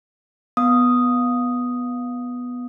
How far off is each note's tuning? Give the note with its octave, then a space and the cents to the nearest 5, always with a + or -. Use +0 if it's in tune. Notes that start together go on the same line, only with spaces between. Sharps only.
B3 +0 D#6 +0